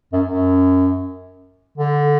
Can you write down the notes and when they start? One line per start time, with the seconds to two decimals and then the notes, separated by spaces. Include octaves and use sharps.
0.13 F#2
0.28 F#2
1.78 D3